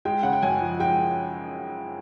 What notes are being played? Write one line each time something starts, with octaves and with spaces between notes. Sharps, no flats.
G#3 G5
C#3 F#5
G5
F#2 G#5
F3
G#3 G5